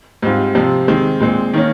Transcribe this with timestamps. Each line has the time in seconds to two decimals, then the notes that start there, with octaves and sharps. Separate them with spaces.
0.22 G#2 G3 C4 F4
0.55 C3 F3 C4
0.88 D#3 G#3 C4
1.20 A#2 G#3 C4
1.54 D#3 A#3 C#4